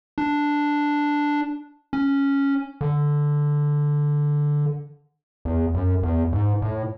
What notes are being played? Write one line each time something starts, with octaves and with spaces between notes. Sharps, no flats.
D4
C#4
D3
E2
F#2
E2
G#2
A2